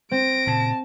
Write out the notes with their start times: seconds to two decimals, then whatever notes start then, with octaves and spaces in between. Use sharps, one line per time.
0.11 C4 A#6 D7
0.47 A#2 C#3 A5